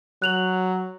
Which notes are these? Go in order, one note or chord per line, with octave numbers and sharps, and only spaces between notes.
F#3 F#6 F7 F#7